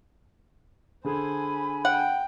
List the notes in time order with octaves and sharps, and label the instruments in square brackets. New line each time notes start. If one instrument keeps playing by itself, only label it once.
[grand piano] D3 G#4 A4 [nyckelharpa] C5 [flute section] G#5 B5
[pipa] F#5 [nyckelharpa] G5